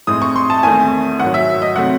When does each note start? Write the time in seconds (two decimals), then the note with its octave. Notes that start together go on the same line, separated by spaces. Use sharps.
0.07 A2 G#3 C4 D#6
0.22 C#6
0.36 C6
0.50 A5
0.63 E2 D#3 A3 C4 G#5
1.20 G#2 D#3 F#3 F#5
1.34 E5
1.62 D#5
1.76 C3 F#3 A3 C4 F#5